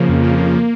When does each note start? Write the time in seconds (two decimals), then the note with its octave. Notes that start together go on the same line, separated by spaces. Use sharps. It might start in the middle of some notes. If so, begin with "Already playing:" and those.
Already playing: C#3 F3 A#3
0.09 F2
0.24 F3
0.38 A#3
0.54 A#3